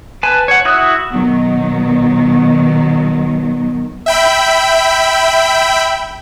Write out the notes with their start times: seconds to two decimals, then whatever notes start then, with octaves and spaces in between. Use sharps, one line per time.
0.23 B4 G#5 A5
0.48 C#5 F#5
0.65 E4 F#4 D#6 F#6
1.11 B2 D#3 F#3
4.06 E5 G5 B5